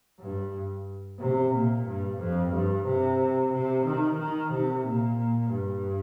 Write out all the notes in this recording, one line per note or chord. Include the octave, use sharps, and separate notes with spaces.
G2
C3
A#2
G2
F2
G2
C3
C3
D#3
D#3
C3
A#2
G2